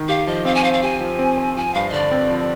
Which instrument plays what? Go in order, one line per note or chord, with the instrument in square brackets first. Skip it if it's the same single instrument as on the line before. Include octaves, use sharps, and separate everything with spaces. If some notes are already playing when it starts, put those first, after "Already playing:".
Already playing: [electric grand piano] D#3
[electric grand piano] G4 [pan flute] F5
[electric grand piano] F3 [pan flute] D#5
[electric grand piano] C4 [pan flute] F5
[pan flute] G#5
[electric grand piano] C5 [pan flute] F5
[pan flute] F5
[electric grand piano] G4 [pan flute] G#5
[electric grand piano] F3
C4
C5
[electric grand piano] F3 [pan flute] G#5
[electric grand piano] G2 [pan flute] F5
[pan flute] D#5
[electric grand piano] D3 [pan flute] D5
[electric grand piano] C4
F3